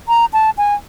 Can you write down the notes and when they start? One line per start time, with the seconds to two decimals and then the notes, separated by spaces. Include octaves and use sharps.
0.08 A#5
0.33 A5
0.58 G#5